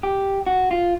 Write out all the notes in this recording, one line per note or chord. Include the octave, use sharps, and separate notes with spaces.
G4
F#4
F4